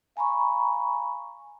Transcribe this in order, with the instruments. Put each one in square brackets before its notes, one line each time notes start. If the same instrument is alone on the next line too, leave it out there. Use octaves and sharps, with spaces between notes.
[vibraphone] F5 G#5 A#5 B5 C#6